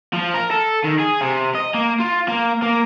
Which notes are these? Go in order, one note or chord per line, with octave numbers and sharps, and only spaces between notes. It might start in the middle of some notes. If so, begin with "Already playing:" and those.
F3
A#4
A4
D#3
G#4
C3
D#5
A#3
F4
A#3
A#3